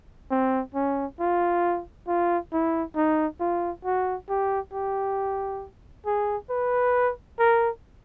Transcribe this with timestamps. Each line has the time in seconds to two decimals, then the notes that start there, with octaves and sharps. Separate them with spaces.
0.31 C4
0.75 C#4
1.20 F4
2.07 F4
2.53 E4
2.96 D#4
3.40 F4
3.85 F#4
4.29 G4
4.74 G4
6.06 G#4
6.50 B4
7.39 A#4